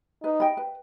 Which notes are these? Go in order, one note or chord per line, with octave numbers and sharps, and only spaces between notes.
D#4 B4
D#5 G5 B5
B4